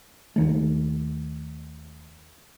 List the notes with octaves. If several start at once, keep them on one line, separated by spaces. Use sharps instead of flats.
D#2 D#3 A3